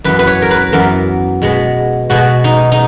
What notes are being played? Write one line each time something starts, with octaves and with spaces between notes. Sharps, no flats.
F#2 E3 B3 B4
B4
C#5
A#4
B4
F#2 E3 B3 A#4
B2 G#3 B3
B2 G#3 B3 F#4
D#4
D#4